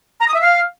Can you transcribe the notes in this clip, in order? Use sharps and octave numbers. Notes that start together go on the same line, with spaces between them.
A#5
D#6
E5
F5